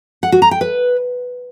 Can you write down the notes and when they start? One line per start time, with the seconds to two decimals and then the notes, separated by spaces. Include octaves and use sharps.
0.23 F#5
0.32 F#4
0.42 A#5
0.51 G5
0.61 B4